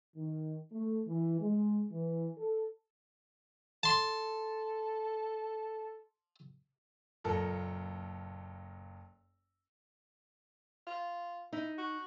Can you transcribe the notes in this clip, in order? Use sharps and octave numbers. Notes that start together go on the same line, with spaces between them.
D#3
A3
E3
G#3
E3
A4
A4 A5 C6
F#1 A#2 A4 A#4
F4
D#4 E4
F#4